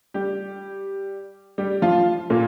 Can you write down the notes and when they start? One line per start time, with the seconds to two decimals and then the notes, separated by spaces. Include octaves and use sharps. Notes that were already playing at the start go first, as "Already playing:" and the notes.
0.14 G3 G4
1.58 G3 G4
1.82 F3 F4
2.30 A#2 A#3